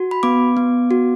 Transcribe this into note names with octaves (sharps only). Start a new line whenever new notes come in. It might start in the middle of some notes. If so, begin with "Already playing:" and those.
Already playing: F#4
B5
B3 D6
B3
F#4